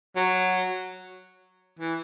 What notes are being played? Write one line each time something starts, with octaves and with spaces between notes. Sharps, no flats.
F#3
E3